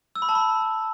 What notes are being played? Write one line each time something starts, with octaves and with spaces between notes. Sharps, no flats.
E6
B5
A5
B5